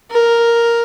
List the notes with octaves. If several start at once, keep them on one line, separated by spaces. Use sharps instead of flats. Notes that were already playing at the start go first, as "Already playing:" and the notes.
A#4